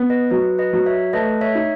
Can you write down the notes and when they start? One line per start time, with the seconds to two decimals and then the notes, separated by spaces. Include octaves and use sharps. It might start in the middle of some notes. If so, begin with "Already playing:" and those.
Already playing: B3
0.10 B4 D#5
0.31 F#3 B4
0.59 B4 D#5
0.73 F#3
0.86 C#5 E5
1.13 A3 B4 D#5
1.41 C#5 E5
1.55 D#4